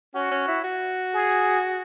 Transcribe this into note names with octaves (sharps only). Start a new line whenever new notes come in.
C#4 F#4
C#4
E4
F#4
G#4